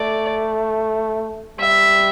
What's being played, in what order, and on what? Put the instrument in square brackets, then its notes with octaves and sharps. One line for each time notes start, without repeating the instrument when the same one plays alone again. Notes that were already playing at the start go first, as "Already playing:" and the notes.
Already playing: [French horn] A3 [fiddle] D5
[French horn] G3 [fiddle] E5